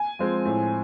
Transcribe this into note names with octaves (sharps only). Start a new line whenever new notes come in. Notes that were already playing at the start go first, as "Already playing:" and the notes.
Already playing: G#5
F3 G#3 C4
A2